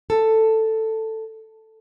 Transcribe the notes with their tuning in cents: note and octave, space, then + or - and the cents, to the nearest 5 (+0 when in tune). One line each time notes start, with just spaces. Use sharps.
A4 +5